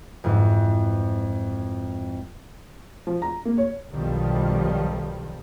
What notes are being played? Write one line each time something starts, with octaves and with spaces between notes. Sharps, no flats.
F2 G#2 E3 F3
F3
A#5
A#3
C#5
B1 G2 B2 D#3 F3 G3